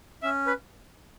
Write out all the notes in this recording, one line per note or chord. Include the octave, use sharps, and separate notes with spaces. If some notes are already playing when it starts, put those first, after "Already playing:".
C#4 E5
B4